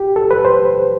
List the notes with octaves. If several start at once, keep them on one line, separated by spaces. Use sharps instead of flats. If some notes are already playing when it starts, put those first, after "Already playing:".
Already playing: G4
A4
B4
C5